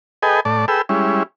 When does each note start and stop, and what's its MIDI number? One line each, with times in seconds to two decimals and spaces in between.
0.23 0.40 68
0.23 0.40 69
0.23 0.40 71
0.23 0.40 75
0.23 0.40 79
0.23 0.40 80
0.45 0.66 45
0.45 0.66 74
0.45 0.66 81
0.68 0.82 68
0.68 0.82 69
0.68 0.82 71
0.68 0.82 79
0.68 0.82 88
0.89 1.23 55
0.89 1.23 56
0.89 1.23 61
0.89 1.23 64